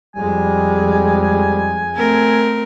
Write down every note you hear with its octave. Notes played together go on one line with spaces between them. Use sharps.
F2 G3 G#3 G#5
A3 C4 A#4